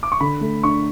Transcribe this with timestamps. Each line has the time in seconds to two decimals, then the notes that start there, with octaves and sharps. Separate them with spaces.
0.03 D6
0.12 C#6
0.20 D3 B5
0.41 A3
0.63 D4 C#6